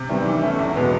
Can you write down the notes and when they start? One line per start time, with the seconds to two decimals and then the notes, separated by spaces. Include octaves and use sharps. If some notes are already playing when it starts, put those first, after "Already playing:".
Already playing: C3
0.09 D#3 G3 B3 E4
0.26 E3
0.42 A3 C#4 E4
0.59 E2
0.76 B2 G#3 B3